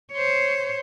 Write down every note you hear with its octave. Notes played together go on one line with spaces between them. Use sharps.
C5 C#5